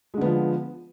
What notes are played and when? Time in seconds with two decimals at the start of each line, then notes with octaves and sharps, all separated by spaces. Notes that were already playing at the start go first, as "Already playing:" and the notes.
0.14 G#3
0.17 D3
0.21 B3
0.25 F3